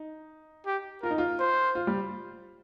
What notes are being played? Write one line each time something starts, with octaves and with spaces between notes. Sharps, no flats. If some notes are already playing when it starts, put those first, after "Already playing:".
Already playing: D#4
G4
F4 A#4
D#4
F4
C5
F4
G3